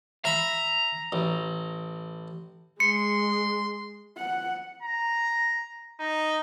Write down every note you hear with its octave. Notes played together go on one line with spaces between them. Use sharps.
E5 A#5 B5
A1
G#3 C6 C#7
F#5
A#5
D#4